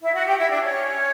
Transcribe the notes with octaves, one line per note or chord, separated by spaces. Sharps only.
E4 E5
F#4 F#5
G4 G5
E4 E5
D4 D5
C#4 C#5